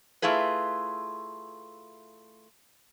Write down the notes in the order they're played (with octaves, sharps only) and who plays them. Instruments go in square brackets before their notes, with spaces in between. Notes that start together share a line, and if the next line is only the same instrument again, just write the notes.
[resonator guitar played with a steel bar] A3 E4 F4 G#4 B4